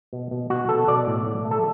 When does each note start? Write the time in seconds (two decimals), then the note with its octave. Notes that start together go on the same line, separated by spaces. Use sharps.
0.13 B2
0.31 B2
0.50 B2 F#4
0.69 B2 A4
0.88 B2 D5
1.07 A2
1.26 A2
1.45 A3
1.51 A4